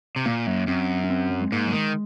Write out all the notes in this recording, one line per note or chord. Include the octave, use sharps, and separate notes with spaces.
C3
A#2 A#3
F#2
F#2 C4
C#4
C4
F#3
G#3
G#2 A#3
F#3
D#3 G#3